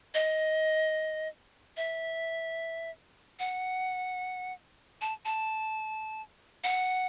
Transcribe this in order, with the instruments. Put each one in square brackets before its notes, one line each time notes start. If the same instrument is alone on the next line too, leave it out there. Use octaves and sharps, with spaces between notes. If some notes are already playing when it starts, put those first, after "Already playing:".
[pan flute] D#5
E5
F#5
A5
A5
F#5